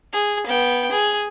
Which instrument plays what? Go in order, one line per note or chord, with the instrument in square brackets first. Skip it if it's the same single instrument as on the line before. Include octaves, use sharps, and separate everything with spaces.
[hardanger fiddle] G#4
B3 G5
G#4